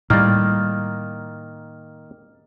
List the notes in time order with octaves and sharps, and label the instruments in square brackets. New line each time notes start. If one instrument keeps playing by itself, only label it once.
[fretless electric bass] A2 G3 [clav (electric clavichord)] D#3 A#3 [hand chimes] F6 A6